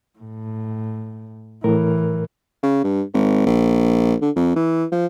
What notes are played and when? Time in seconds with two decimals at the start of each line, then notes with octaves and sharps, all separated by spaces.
0.19 A2
1.64 A2 E3 A#4
2.63 C#3
2.84 G2
3.14 G#1
3.46 A#1
4.22 D3
4.36 F2
4.56 E3
4.92 F3